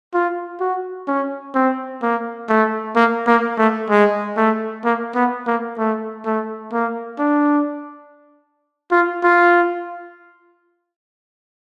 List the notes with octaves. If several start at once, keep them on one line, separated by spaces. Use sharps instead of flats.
F4
F#4
C#4
C4
A#3
A3
A#3
A#3
A3
G#3
A3
A#3
B3
A#3
A3
A3
A#3
D4
F4
F4